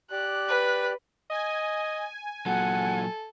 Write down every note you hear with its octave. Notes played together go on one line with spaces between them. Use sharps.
G4 D5 F#6
B4
D#5 G#5
A#2 F#3 A4 F#5